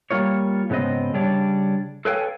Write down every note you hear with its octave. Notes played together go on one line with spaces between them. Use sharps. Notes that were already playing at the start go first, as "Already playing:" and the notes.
G3 A#3 F4 C#5
G#2 C#3 B3 C4 D#5
C#3 G3 D4 C#5 D5
A4 B4 C#5 F5 G5 G#5